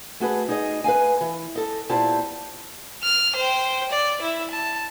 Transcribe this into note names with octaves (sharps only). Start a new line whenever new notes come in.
A3 F#4 G#4 B4
D#4 G#4 D#5
B4 D#5 F5 G#5
E3
A4 D#5
A#2 B3 C4 E4 G4 A5
F6
C5 G5
D5
E4 E5
A5